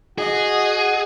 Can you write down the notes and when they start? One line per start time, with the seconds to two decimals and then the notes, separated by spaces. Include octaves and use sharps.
0.18 F#4 G#4 D#5 F#5